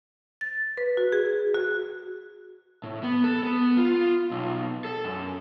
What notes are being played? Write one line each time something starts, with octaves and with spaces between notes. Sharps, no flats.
A6
B4
F#4
G#4
F#4
A2
B3
A4
B3
F4
B1
A4
F#2